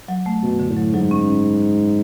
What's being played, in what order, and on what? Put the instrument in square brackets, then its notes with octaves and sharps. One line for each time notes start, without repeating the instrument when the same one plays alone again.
[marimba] F#3
A3
[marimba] F#2 [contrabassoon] B2
[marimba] D3
[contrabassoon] A2
[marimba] F#3
[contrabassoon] G#2 [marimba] F#3
[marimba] C#4